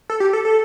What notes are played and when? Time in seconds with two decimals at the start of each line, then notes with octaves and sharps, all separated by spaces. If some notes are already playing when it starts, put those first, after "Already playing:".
0.10 A4
0.20 G4
0.33 A4
0.45 A4